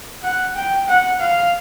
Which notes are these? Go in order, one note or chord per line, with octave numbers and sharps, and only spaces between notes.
F#5
G5
F#5
F5